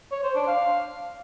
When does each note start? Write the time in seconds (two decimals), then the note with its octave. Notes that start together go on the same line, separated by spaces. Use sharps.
0.12 C#5
0.24 C5
0.35 D4
0.47 F5